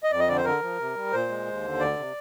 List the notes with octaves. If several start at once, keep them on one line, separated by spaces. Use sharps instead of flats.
D#5
F2 D5
D#5
D3 D5
C5
D3 A#4
F3
C3
G3
A#2 C5
G#3
D#2
D3
D2 D5
C3